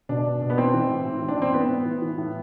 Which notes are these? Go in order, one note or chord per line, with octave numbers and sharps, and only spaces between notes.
B2 D4
B2
B2
B3
E3 C4
E3
A2
A2
E3
D4
E3 C4
A2 B3
A2
E3
E3
A2